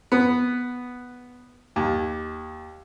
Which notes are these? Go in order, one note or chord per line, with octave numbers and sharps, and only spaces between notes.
B3
D#2